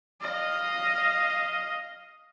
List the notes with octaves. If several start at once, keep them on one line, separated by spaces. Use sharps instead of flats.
D#5 F5